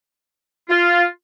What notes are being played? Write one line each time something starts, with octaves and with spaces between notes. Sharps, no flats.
F4